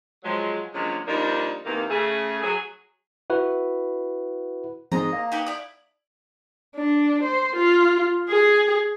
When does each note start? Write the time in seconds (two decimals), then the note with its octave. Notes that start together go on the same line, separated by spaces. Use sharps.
0.24 F3 F#3 G#3
0.74 D3 F3 F#3 G#3 A#3 C#4
1.07 G2 F3 A#3 D4 D#4
1.65 C3 D#3 E3 A#3
1.90 C#3 A3 G#4
2.42 F#3 G#4
3.30 E4 F#4 B4
4.92 G#2 F3 C4 D#5 A#5
5.12 A#3
5.32 D#4 G4 B4
5.47 E4 D5 D#6
6.76 D4
7.23 C5
7.56 F4
8.29 G#4